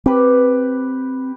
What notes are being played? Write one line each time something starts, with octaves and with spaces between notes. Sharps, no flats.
C4 G4 B4